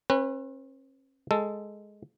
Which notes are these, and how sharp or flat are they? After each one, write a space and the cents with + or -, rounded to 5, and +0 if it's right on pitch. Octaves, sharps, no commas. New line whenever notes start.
C#4 -45 B4 +0
G#3 +0 A4 +5